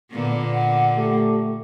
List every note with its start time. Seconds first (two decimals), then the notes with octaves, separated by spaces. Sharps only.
0.11 A#2 D3 A#3 B3
0.53 F#5
0.96 A3 G4